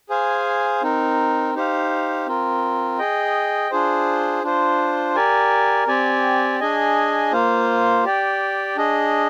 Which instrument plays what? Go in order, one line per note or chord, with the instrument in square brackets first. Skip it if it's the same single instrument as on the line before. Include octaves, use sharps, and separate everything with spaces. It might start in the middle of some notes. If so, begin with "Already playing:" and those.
[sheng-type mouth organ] G#4 C5 F5 G#5
C4 D#4 A#4
D#4 G4 C5 F5
C4 F4 A#4
G#4 D#5 G5
D4 F4 G#4 C5
D4 F4 C5
G4 A#4 D5 G#5
C4 G4 D5 G#5
D4 G#4 D#5 G#5
A#3 F4 C5 F5
G4 D5 G5
D4 G#4 D#5